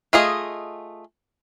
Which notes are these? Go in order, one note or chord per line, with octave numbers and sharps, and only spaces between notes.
A3 F4 G#4 D#5